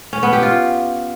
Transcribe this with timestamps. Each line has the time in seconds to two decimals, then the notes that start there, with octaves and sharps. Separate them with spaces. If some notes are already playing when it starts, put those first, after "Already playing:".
0.13 C#4
0.23 B3
0.33 G4
0.43 F4